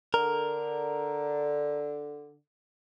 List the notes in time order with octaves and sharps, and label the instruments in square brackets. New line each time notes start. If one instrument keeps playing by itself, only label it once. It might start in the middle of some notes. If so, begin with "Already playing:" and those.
[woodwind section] D3 [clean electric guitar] A#4